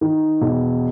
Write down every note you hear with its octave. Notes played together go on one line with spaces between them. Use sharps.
D#3
E1